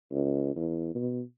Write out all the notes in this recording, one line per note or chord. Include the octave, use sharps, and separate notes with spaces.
C#2
E2
B2